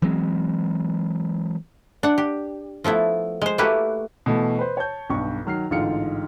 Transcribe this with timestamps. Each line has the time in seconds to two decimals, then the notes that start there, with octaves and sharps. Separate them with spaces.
0.02 E3 F#3 G#3 C4
2.03 D4 F#5
2.18 G4
2.84 F3 A3 B3 E4
3.42 G#3 C5
3.58 A3 A#3 E4 F#4 G4 B4
4.26 B2 E3 A3
4.59 B4 C5
4.77 C#5 A5 G6
5.10 B1 G2 C#6
5.45 D#3 F#3 F6 C7
5.71 A1 G#2 D3 F4 F6 C#7